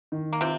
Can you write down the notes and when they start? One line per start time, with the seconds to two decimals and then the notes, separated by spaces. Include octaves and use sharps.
0.12 D#3
0.33 A#3
0.41 C3 C4 F4